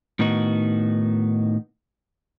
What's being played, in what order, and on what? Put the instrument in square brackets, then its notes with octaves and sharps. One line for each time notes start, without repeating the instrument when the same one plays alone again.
[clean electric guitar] A2 D#3 B3 D#4 F#4